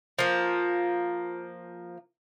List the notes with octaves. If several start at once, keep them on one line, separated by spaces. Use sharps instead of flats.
F3 A#3